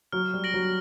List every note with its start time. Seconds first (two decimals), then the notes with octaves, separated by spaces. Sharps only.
0.12 F#3 F6
0.34 G3
0.44 A#6 D7 F#7
0.54 F#3